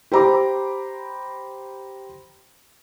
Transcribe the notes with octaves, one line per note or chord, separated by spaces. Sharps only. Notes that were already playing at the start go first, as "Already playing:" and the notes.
G4 C5 A#5 B5 D6